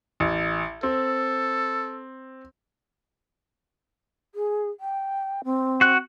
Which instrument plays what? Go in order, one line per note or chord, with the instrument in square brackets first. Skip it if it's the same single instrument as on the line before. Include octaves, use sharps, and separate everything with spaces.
[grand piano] A1
[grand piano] C4 [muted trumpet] A4
[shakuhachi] G#4
G5
C4
[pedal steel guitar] F#4 F#6